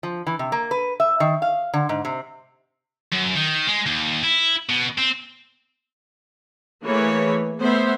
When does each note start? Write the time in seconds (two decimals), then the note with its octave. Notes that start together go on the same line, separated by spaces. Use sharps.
0.03 F3
0.27 E3
0.39 C3
0.52 A#3
0.71 B4
1.00 E5
1.20 D#3
1.42 F5
1.74 D3
1.89 G#2
2.05 C3
3.12 F#2
3.36 D#3
3.67 G#3
3.86 D#2
4.23 E4
4.69 B2
4.98 C4
6.84 E3 A3 A#3 G#4 B4 C#5
7.60 A3 B3 C5 E5